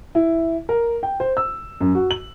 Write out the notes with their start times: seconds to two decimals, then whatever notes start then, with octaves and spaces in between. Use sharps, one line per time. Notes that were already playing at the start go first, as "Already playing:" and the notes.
0.15 E4
0.69 A#4
1.03 G5
1.20 C5
1.37 E6
1.81 F#2
1.95 F#4
2.11 F#7